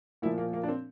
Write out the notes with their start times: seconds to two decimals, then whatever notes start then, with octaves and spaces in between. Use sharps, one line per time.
0.22 A#2 F3 E4
0.38 A#3
0.53 A#3
0.63 D4
0.68 C4